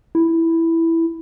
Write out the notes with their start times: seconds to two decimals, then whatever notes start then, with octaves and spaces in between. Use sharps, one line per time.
0.15 E4